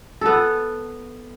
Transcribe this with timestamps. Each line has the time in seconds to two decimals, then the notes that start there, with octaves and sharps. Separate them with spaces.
0.21 B3 A4